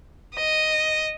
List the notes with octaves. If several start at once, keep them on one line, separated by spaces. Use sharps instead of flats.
D#5